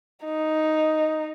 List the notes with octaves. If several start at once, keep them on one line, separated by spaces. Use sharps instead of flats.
D#4